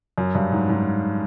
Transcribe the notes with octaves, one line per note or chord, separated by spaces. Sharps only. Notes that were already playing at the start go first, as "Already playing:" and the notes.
F#2
G2
G#2
G#2